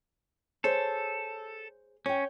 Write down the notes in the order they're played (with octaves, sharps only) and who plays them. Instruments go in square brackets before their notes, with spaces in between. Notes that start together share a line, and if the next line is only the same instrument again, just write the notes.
[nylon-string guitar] G#4 C5 C#5 [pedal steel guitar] A4
[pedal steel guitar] C#4 [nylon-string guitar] C#5 G5